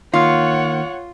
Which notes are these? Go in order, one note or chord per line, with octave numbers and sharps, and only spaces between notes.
D#3 A#3 F4 C#5 F#5 F6